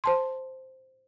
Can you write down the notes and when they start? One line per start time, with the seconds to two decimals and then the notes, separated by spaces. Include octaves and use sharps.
0.04 C5 A5 C6